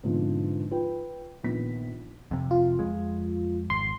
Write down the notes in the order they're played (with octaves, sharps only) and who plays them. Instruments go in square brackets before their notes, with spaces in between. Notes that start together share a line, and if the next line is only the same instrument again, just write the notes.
[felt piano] G#2 B2 D3 F3 C4
F4 B4 G5
A#1 D#3 B3 B6
[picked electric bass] F2 C3
[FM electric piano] F4
[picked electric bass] F2 G#3
[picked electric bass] G#1 [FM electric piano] C6